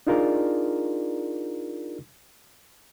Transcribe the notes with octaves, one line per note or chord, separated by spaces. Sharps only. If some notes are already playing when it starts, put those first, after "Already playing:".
D4 D#4 F4 G#4 A#4 D5